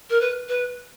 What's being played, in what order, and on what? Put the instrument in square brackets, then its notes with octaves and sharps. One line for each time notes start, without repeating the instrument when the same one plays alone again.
[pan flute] A#4
B4
B4